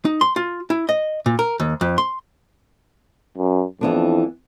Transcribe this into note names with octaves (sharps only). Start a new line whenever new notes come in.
D#4
C6
F4
E4
D#5
A#2
A#4
D#2
F2
C6
F#2
F2 E3 B3 D4